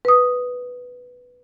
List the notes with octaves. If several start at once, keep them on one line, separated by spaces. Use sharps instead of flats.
B4 D#6